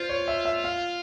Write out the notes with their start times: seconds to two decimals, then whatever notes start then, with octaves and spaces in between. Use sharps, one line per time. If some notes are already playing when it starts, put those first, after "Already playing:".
Already playing: F4 C5
0.09 C#5
0.28 E5
0.45 E5
0.64 F5